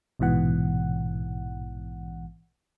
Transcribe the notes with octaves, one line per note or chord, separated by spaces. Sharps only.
A#1 G#2 B2 E3 F#5